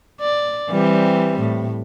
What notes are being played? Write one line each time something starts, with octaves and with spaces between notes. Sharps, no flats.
D5
E3 G3 C4
A2